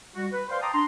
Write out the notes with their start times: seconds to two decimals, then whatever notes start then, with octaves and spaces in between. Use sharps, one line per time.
0.16 G3 F#4
0.32 B4
0.49 B4 C5 D5 F5 G5 C6
0.61 G5 A5 A#5 C6 D6 D#6
0.73 D4 A#5 C6